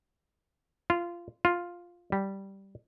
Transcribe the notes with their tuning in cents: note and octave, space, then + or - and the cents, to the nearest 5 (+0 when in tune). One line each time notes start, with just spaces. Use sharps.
F4 -15
F4 +5
G3 -5